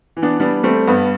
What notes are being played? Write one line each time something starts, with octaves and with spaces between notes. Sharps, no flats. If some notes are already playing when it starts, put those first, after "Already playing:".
E3
B3 D4
G3 B3 D4
G3 A3 C4
G2 B3